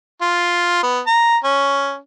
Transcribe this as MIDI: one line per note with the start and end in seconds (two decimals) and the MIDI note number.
0.21 0.81 65
0.83 1.00 59
1.06 1.37 82
1.44 1.97 61